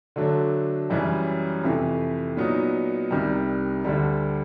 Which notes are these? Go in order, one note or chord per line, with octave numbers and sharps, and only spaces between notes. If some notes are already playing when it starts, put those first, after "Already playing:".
D3 F#3 A3 D4
F#2 C#3 E3 G3
F2 C3 E3 A3
A#2 F#3 B3 D#4
C2 C3 D#3 G3
D2 D3 G3